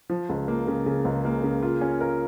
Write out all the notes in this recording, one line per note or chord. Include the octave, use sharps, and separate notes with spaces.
F3
C#2
A#3
C#3
C#3
C#2
A#3
C#3
F4
C#4
A#4